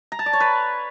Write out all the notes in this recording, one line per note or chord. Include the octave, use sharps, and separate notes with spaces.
A#5
A5
D5
C#5
B4